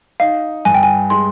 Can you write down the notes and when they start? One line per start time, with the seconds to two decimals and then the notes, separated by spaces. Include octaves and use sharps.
0.20 D#4 F5
0.65 G2 G#5
0.74 G5
0.83 G#5
1.10 G#3 C6